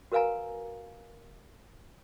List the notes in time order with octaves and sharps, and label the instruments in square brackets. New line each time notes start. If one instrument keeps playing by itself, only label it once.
[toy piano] F#4 A#4 B4 F5 G#5 A#5